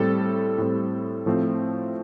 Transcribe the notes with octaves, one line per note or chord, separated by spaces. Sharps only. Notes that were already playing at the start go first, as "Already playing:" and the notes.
Already playing: A2 G3 C4 A4
A2 G3 C4
A2 F3 A3 C4